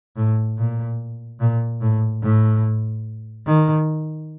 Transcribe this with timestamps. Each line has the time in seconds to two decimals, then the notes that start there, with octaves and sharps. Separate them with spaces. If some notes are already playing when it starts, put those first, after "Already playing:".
0.17 A2
0.58 A#2
1.40 A#2
1.81 A2
2.22 A2
3.46 D#3